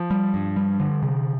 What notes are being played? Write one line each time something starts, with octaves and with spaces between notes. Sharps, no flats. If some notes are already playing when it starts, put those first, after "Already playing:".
Already playing: F3
G3
G2
G3
D3
C3